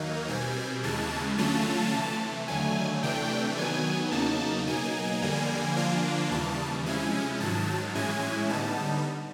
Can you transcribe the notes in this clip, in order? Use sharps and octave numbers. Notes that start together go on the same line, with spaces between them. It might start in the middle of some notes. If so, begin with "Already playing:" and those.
Already playing: D#2 D#3 F#3 A#3 D#4
B2 G3 C4 G#5
D#2 C#3 E3 G#3 A5
D3 F#3 A3 C#4 F4 A5
C3 E3 A3
D#2 D3 F#3 A3 G#5
C3 E3 A3 D4 G5
D#3 F#3 B3 G#5
E2 C#3 F#3 A#3 D#4 A5
B2 F#3 A#3 D#4 G#5
F2 D3 G3 A#3
D3 F3 A#3 D4 F4
D#2 C#3 E3 G3 A5
C3 F3 G#3 C#4 E4 G#5
G#2 D#3 F#3 A5
A2 E3 G#3 C#4 E4 G#5
D3 G3 B3 D#4 A5